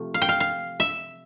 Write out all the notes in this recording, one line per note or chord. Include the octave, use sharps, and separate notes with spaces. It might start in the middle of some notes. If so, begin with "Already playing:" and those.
Already playing: C3 F3 A3
F5
G5
F5
F5
E5